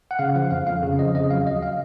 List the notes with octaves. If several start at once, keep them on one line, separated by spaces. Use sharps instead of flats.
F#5
C#3 F5
F3 F#5
F2 F5
F2 F5
C#3
F3 D#5
C#3 D#5
F#3 F5
D#2 D#5
F5